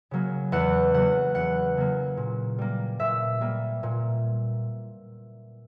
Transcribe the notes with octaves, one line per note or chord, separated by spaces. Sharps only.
C#3 F#3 A#3
E2 F#5
C#3 F#3 A#3 F#5
E2 F#5
C#3 F#3 A#3
A#2
G3 A#3
A#2 E5
G3 A#3
A#2